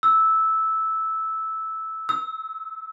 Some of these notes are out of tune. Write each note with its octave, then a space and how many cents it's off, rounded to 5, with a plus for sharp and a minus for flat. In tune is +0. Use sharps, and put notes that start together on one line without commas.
E6 -10
E6 -35